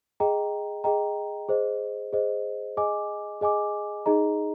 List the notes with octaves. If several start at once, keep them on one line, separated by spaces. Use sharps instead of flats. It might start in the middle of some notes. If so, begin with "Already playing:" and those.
G#4 D#5 G5 A#5
G#4 D#5 G5 A#5
G#4 C5 D#5
G#4 C5 D#5
G#4 D#5 G#5 D6
G#4 D#5 G#5 D6
D#4 G#4 D#5 A#5